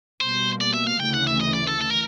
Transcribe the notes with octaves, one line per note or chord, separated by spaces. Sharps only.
B2 G3 A#3 C5
D5
E5
F5
D2 C#3 E3 G5
F#5
E5
D#5
D5
A4
A4
A#4